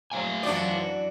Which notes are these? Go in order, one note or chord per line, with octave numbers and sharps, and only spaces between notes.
A#2 F#3 A3 C5 F5 G#5
F#2 E3 F#3 D4 F#4 D5